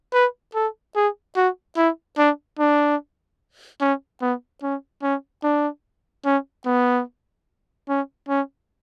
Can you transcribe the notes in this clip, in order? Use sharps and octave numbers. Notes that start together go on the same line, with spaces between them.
B4
A4
G#4
F#4
E4
D4
D4
C#4
B3
C#4
C#4
D4
C#4
B3
C#4
C#4